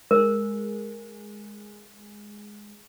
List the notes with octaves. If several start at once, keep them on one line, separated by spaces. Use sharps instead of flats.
G#3 G#4 A#4